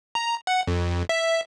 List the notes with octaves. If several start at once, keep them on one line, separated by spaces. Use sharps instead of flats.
A#5
F#5
F2
E5